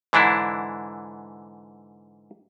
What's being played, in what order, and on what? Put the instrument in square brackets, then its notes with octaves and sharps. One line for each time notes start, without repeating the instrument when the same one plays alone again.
[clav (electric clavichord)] G#2 D3 E3 D4 E4